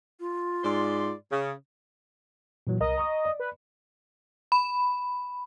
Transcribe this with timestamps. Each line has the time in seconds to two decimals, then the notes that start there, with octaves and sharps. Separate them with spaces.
0.20 F4
0.63 G#2 D5 C6
1.31 C#3
2.67 A#2 E3 F#3
2.80 C2 A#4 D#5 A#5
2.98 A#5 C#6 D#6
3.25 D5
3.40 B4
4.52 B5